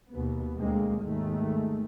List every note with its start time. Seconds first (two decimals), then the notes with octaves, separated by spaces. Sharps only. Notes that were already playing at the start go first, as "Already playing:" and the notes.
0.11 D#2 B2 B3
0.56 D2 G#3 A#3 C4
1.01 G#1 D#2 D#3 G#3 A3